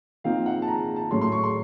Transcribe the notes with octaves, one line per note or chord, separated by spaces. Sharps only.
A#2 F3 C4 D#4 F5
F#5
A5
A#5
A5
A2 F#3 A3 C#4 C6
C6
C#6
C6